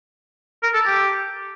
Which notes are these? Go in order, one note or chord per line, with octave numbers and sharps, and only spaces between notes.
A#4
A4
G4